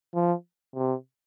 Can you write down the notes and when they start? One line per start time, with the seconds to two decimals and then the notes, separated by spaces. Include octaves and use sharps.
0.15 F3
0.75 C3